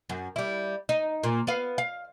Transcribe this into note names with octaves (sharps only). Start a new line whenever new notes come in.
F#2
G3 E4
D#4
A#2
B3 F5
F5